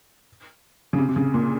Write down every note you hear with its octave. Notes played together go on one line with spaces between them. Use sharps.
C#3
C3
C3
C#3
A#2